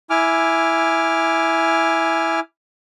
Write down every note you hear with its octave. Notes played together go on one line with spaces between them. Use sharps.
E4 G#5 D6 F6